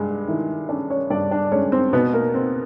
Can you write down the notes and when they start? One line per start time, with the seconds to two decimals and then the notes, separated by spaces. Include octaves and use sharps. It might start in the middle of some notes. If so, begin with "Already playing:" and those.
Already playing: G2 G#3
0.28 D#3 E4 E5
0.69 C#4 D4 D5
0.90 C#4 C#5
1.10 G2 D4 D5
1.31 D4 D5
1.52 G#3 C#4 C#5
1.72 C4 C5
1.93 B2 B3 B4
2.13 A#3 A#4
2.34 C4